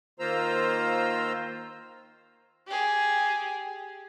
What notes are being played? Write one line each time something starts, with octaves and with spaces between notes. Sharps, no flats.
D#3 A#3 F4 C5 A#5 E6
G4 G#4